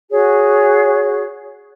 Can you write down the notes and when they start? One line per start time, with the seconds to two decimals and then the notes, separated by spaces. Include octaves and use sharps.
0.10 F#4 G#4 C#5